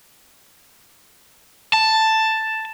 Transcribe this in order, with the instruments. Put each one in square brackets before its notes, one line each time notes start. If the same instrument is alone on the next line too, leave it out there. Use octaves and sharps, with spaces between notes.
[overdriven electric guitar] A5